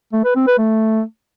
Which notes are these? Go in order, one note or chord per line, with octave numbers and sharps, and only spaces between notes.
A3
B4
C4
B4
A3